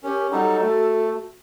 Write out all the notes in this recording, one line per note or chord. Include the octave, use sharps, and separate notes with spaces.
C#4 G4 A#4
F#3 G3 D#4 A4 F#5
A3 F#4